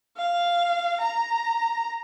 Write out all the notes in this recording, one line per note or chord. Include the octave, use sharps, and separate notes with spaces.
F5
A#5